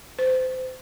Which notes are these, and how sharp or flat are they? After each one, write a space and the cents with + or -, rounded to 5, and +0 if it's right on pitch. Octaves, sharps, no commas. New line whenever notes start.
C5 -25